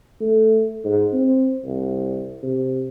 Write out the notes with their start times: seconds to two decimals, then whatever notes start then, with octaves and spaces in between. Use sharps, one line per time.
0.21 A3
0.84 G#2
1.13 C4
1.65 C2
2.43 C3